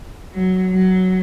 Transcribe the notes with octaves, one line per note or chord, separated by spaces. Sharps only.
F#3
F#3